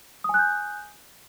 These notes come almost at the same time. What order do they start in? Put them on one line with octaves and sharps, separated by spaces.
D#6 G#5 F#6 G6